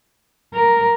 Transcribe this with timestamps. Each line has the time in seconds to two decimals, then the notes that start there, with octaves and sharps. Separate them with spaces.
0.54 A#4